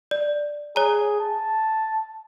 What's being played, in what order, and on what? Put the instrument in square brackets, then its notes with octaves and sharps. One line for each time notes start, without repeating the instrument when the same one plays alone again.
[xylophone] D5
[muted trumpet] G#4 [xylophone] C#5 A#5
[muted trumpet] A5